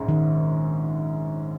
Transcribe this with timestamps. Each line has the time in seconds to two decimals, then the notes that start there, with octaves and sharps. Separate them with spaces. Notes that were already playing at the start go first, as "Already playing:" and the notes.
Already playing: A#1 G#2 G#3 C#4
0.09 D#3